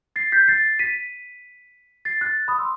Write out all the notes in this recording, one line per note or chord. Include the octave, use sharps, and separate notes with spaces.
A6 C7
G6 B6
A6 C7
B6 D#7
A6 C7
F#6 A6
B5 D#6
C6 E6